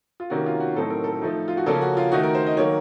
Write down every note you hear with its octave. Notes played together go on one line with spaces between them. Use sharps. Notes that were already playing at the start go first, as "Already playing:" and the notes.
F4
C3 D#3 A#3 C#4 F#4
F4
F#4
A2 F#3 C4 D#4 A4
A#4
A4
F3 A3 D#4
F4
F#4
C#3 F3 A#3 C#4 A4
F#4
F4
D#3 A3 D#4 F#4
A#4
C5
D#5
D#3 F#3 A#3 C#5